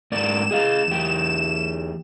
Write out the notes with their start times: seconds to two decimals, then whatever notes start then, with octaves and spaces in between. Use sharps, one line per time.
0.12 G#2 A#4 D5 E7
0.51 G#4 D#5 F5
0.88 E2 G4